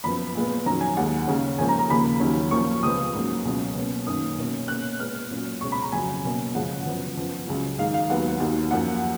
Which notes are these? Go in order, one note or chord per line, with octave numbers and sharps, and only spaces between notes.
F#2 F3 B3 B5
A#2 G#3 B3
F2 D#3 F#3 C#4 A#5
G#5
D#2 D#3 G#3 F#5
D#2 C#3 G#3 C#4
G#2 F3 A#3 C#4 G#5
A#5
A#5
D#2 C#3 F3 A#3 B5
D#2 D#3 F#3 C#4
A#2 F3 A#3 C#4 C#6
C#2 C#3 F3 B3 D#6
G#2 F#3 A#3 C#4
C#2 B2 F#3 C#4
B2 A#3 C#4
F#2 D#3 A#3 C#4 D#6
B2 A#3 C#4
B2 A#3 C#4 F#6
A#2 G#3 B3 F6
A#2 F#3 C#4
C#2 B2 G#3 C#4 C#6
B5
A#5
F2 C#3 F#3 C#4 G#5
B2 A#3 C#4
F#2 C#3 F3 G#3 C#4 F#5
F#2 C#3 F3 B3
F#2 F3 B3
C#2 C#3 F#3
G#2 D#3 G#3 F5
F5
D#2 D#3 F#3 B3 F#5
D#2 D#3 F#3
F#2 F3 A#3 F#5